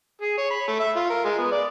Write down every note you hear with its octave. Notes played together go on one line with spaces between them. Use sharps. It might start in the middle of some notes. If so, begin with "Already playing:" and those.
G#4
C#5
B5
A3
E5
F4
A#4
G#3
B3
D5